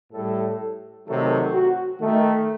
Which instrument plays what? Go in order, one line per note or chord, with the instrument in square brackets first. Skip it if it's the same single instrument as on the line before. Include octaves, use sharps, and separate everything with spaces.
[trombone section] A2 G3 A4
C3 D#3 F#3 A3 A4
F#4
D#3 A3